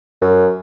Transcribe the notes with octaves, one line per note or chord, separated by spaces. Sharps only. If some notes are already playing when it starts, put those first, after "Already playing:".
F#2